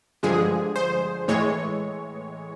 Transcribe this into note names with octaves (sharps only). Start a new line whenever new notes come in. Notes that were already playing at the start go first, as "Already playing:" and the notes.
G2 D3 F3 G#3 G#4
C5
A2 E3 G#3 C#5